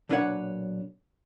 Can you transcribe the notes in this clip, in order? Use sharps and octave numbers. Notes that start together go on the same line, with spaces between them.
B1 A#2 D4 B4 C#5 F#5